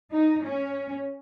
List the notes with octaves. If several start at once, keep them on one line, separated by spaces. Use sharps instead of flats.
D#4
C#4